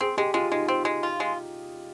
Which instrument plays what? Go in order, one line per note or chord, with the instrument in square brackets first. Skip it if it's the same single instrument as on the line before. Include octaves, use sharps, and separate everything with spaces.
[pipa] C4 [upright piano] G#4
[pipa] G#3 [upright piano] G4
[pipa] G#3 [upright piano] F4
[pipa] G#3 [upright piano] D#4
[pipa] C4
G#3
F4
G#3